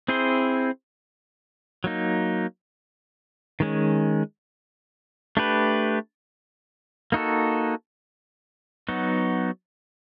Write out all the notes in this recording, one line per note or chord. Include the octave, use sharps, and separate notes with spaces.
C4 E4 G#4 C5
F#3 A#3 D#4
D#3 G#3 C#4
A3 D4 G4 B4
A#3 D#4 F#4 A4
F#3 B3 D#4 F#4